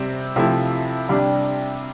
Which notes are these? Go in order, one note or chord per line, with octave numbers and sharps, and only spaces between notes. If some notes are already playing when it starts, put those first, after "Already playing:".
Already playing: C3 G3 C4
C3 F3 A3 E4
C3 G3 D4